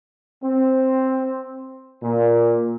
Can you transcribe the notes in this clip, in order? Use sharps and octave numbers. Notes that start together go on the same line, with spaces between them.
C4
A#2